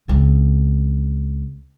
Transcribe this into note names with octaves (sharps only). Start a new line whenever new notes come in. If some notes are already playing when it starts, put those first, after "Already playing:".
C#2 C4